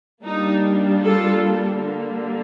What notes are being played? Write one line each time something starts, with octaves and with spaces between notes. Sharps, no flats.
G3 A#3 D4 D#4
F4 A4
D3 G3 A#3